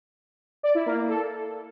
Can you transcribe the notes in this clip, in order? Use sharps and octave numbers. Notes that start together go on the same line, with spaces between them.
D5
E4
A#3
A#3
A4